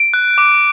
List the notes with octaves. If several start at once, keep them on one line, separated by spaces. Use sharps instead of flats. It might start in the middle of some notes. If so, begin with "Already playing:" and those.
Already playing: D7
F#6
D6